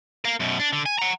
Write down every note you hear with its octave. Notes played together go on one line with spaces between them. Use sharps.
A#4 F5
F#2 B2
D4
D3
G#5
F#5 A#5